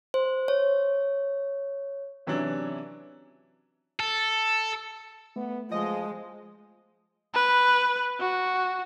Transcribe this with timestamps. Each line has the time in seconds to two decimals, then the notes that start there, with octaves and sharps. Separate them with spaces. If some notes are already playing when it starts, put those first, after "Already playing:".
0.14 C5
0.48 C#5
2.27 C3 E3 F#3 C#4 D4
4.00 A4
5.36 A3 B3
5.71 F3 G#3 D#5
7.34 B4
8.21 F#4